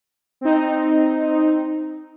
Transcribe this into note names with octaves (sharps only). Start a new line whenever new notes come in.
C4 D#4